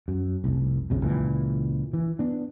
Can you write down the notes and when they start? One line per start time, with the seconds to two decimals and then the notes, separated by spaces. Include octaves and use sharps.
0.08 F#2
0.44 F1 C2
0.90 B1 F2 C#3
1.02 C#2 A#2 E3
1.93 E3
2.19 B3 D4